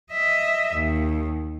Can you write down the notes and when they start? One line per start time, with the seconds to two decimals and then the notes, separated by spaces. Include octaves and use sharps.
0.12 D#5 E5
0.73 D#2